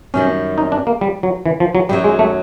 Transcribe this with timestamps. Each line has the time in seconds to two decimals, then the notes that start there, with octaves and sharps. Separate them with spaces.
0.14 F#2 D#3 G3 C#4
0.58 D#4
0.72 D4
0.87 A#3
1.01 G3
1.23 F#3
1.46 E3
1.60 F3
1.75 F#3
1.89 F#2 D#3 F#3 G3
2.04 G#3
2.19 A3